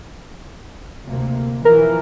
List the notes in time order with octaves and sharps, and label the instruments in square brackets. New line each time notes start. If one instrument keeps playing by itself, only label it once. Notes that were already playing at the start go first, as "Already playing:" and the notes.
[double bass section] D2 C3 A#3
[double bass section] B2 E3 F3 [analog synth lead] A#4